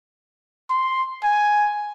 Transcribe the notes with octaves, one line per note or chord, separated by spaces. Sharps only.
C6
G#5